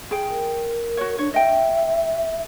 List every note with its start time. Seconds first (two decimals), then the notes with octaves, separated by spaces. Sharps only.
0.11 G#4 G5
0.30 A#4
0.97 F#4 C#5
1.18 D4 C#5
1.34 D#5 E5 G5